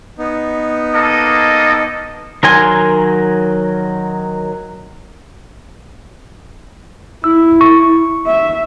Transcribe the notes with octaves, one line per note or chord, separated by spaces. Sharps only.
B3 D#4
A#3 A4 D#5
D#3 F#3 A#4 G#5 C6
E4 E6
C#6
E5